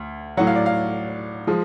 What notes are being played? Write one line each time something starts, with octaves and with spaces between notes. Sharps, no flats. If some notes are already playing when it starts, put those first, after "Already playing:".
Already playing: D2
A2 F#3 F#5
F5
D5
F5
F3 G#3